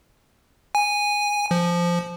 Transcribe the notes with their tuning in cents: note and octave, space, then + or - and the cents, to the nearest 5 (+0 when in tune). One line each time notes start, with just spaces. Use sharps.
G#5 -10
F3 -10